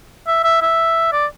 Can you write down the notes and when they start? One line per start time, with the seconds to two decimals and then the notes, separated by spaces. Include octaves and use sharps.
0.27 E5
0.44 E5
0.62 E5
1.12 D5